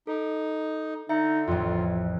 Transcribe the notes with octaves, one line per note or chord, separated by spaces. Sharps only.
D#4 A4
D3 D#4 E5 C#7
A1 F2 F4